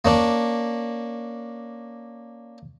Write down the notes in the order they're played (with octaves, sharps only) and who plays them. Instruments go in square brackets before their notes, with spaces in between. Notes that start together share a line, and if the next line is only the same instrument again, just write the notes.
[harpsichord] A#3 C#4 D4